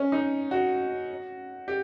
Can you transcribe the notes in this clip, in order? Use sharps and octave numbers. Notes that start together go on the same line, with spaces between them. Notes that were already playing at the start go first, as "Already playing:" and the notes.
Already playing: C#4
D#4
F#4
G4